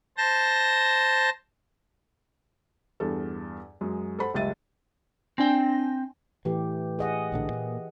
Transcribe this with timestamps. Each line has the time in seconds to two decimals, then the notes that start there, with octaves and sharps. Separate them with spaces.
0.17 C5 A5 A#6
3.00 E2 G2 A4
3.81 F#2 G#3
4.19 A4 C5 F#5 B5
4.34 F#1 C#2 G3 E5 A6 D#7
5.38 C4 D4 G5 G#5 A#6
6.45 A2 E3 G4
6.99 G#4 D#5 F#5
7.32 A#1 A2 D3
7.49 A#2 A#3